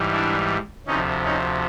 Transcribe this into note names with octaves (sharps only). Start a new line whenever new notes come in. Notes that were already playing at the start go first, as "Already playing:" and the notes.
Already playing: G#2 E3 G3
D4 E4
D2 C3 F3 C#4 D#4
C#4 D#4